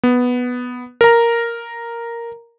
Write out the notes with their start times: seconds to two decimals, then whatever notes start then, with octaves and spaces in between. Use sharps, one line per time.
0.03 B3
1.01 A#4 A#5